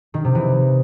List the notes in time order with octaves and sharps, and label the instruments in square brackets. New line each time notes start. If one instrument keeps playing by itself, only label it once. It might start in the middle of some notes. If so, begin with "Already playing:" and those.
[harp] D#3
C3
E3